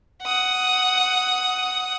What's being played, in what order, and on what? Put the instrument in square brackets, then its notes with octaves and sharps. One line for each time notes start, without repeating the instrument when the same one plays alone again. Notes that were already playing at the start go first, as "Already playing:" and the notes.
[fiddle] F#5 D#6